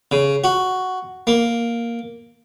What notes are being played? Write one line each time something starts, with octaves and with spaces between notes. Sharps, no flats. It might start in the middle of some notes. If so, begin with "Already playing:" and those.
C#3
F#4
A#3